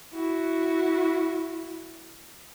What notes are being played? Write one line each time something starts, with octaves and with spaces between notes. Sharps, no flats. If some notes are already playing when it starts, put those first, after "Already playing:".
E4 F#4